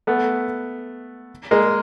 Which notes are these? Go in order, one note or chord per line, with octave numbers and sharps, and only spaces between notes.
A3 B3
G#3 A#3